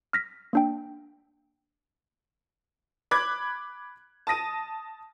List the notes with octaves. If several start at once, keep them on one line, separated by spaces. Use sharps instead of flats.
F6 A#6 B6
A#3 D4 G5
B5 D6 F#6 G#6
A5 D#6 A#6 D#7